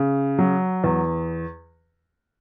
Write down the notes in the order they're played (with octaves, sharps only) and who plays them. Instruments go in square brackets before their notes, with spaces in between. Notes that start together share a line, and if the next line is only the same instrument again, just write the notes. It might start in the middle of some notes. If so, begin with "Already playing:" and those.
Already playing: [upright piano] C#3
F#3
E2